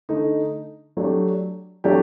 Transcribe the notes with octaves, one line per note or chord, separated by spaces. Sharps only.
D3 A3 D#4
F#3 A3 D4 G4
F#3 A3 D4 G4